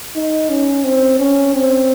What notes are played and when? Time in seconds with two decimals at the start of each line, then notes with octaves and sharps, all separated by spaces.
0.15 D#4
0.50 C#4
0.84 C4
1.19 C#4
1.54 C4